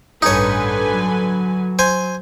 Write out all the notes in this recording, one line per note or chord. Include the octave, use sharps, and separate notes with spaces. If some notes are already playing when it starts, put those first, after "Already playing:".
A1 G2 D3 D#4 B4 C#5 G#5
F#3
C5 G#5